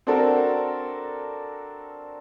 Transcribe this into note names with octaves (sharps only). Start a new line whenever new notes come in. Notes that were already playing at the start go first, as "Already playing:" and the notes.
C4 D4 F#4 A4 A#4